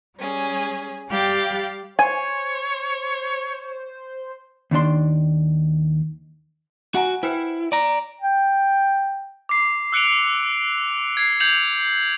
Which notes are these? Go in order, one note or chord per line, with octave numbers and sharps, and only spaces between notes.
G3 C#4 G#4
G3 G4 F5 G5 F#6 A6
C5 C#5 G#5
D#2 D#3 D4 C6
F#4 F#5 G#5 A#5
E4 B4 C5 G5
D5 A#5
G5
D6 C7
E6 F#6 C#7 D7 F7
G#6 C7
G6 G#6 C7 C#7 F7 F#7